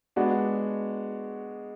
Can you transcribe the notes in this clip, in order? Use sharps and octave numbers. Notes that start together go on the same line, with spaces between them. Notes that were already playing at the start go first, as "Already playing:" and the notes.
G#3 B3 D4 F#4